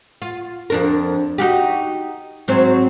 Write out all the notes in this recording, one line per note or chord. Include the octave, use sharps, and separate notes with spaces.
F4
F2 D4 A#4
D#4 F#4 G4
G#2 F#3 C4